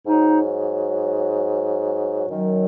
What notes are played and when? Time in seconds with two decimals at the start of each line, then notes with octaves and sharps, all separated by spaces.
0.07 G#2 F#3 D#4
2.29 F#2 D#3 F#3